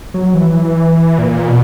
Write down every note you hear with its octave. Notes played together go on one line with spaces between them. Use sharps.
F#3
E3
A#2
B2